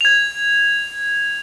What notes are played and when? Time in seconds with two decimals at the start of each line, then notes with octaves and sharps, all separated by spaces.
0.01 G#6 F7